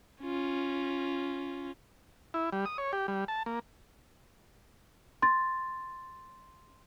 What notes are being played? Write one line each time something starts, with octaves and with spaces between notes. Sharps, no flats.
C#4 F4
E4
G3
D#6
C#5
G4
G3
A5
A#3
C6 A6